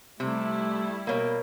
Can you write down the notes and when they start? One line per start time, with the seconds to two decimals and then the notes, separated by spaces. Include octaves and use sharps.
0.20 C3 G3 A3 E4
1.07 B2 A#3 A#4 C#5